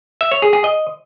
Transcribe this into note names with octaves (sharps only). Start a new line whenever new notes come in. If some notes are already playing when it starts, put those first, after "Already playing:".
E5
C#5
G#4
G#4
D#5